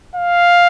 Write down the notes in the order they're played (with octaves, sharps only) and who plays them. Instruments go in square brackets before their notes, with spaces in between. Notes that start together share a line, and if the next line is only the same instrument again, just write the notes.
[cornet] F5